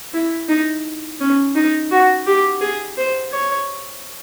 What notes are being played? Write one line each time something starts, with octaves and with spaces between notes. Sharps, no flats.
E4
D#4
C#4
D#4
F#4
G4
G#4
C5
C#5